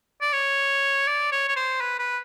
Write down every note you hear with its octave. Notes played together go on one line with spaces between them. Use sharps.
D5
C#5
D5
C#5
C#5
C5
B4
B4